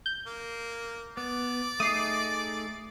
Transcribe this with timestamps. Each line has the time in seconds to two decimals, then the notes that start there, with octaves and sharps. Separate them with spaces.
0.06 G6
0.26 A#3
1.17 B3 D5
1.80 A3 D#4 G#4 D#6 C7